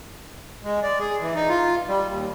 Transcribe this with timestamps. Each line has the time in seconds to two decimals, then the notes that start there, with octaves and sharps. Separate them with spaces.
0.64 G#3
0.83 D5
1.00 G#4
1.20 E3
1.35 D#4
1.49 F4
1.88 G3
2.08 D#2